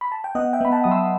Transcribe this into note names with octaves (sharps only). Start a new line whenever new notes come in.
B5
A5
G5
B3 D#5 F#5
E5 G5
B3 B5
F#5 A5
F#3 D#6
C6 E6